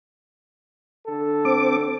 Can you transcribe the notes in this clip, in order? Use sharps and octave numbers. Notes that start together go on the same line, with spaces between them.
D3 A4
C4 D6